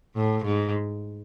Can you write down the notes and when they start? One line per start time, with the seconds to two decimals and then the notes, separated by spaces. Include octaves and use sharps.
0.16 A2
0.45 G#2